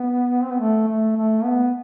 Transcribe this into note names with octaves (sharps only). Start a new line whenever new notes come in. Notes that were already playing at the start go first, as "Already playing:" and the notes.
Already playing: B3
C4
B3
A3
A3
A3
B3